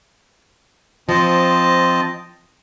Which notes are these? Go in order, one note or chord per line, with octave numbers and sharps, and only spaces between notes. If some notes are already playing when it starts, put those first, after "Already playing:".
F3 C4 D#5 A5